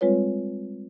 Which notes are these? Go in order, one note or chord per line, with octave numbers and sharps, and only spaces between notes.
G3 G#3 C4 F4 B4 C#5